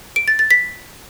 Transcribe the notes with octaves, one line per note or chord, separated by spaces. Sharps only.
D7
A6
A6
B6